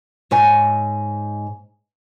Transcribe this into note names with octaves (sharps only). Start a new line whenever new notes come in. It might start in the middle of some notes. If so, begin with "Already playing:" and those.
G#2 C#5 G#5